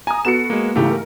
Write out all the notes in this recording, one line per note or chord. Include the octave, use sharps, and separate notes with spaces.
G#5 A#5 D#6
B3 F#4 A4 C#7 E7
G#3 A#3
G#2 C#3 E3 A3 G4
A#4